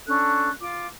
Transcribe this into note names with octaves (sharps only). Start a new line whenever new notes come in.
C#4 D4 A4 F#6
F4 D6